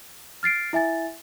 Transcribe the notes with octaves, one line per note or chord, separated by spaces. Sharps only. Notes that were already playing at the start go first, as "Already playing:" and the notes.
F6 A6 C7 D7
E4 E5 G#5 A6